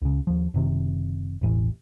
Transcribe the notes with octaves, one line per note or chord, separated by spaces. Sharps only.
C#2 C#3
D#2 F3
F#1 C3 D#3
E1 A1 E3